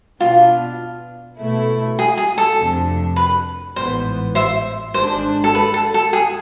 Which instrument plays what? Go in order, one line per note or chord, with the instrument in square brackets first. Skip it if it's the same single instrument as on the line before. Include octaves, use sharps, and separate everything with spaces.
[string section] B2 B3 D4 [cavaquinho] F4
[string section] B2 A3 E4
[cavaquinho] G#4
G#4
A4
[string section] F2 C3 F3 A3 D4
[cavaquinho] B4
[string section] A1 G#2 E3 B3 [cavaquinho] C5
[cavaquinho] C5 E5
[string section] G#1 G#2 G#3 D4 [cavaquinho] C5
[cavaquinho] A4
B4
A4
A4
G#4